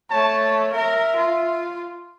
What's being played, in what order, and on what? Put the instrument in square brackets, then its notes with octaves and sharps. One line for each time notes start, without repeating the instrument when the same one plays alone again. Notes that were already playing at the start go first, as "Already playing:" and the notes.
[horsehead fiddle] A3 C#5 [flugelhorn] A5
[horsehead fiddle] A#4 A#5 [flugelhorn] E5
[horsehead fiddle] F4